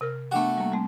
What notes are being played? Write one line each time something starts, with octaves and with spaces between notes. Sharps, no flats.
C3 A#4 F6
A3 B3 D4 F#4 G5
G3 A#3
G3 A3 C4